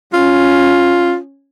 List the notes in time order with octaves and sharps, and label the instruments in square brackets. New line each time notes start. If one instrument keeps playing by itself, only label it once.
[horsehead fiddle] C#4 [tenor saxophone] F4